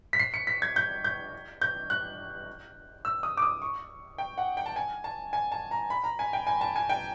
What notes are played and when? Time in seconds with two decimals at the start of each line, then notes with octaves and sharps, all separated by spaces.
0.13 B6
0.19 C7
0.34 C#7
0.47 B6
0.62 G#6
0.76 G6
1.04 G6
1.62 G6
1.90 F#6
3.05 E6
3.23 D#6
3.37 D6
3.42 D#6
3.62 C#6
4.18 G5
4.38 F#5
4.57 G5
4.66 A5
4.76 G#5
5.04 A5
5.33 G#5
5.52 A5
5.71 A#5
5.90 B5
6.04 A#5
6.19 G#5
6.33 G5
6.47 G#5
6.61 A5
6.76 G#5
6.89 G5